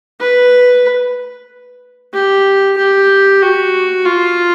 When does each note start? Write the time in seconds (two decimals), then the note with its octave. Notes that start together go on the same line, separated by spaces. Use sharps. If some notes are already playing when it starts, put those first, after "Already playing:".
0.20 B4
2.13 G4
2.77 G4
3.42 F#4
4.05 F4